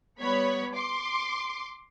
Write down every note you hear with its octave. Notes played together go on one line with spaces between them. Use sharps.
G3 B3 C#5 B5
C6 D6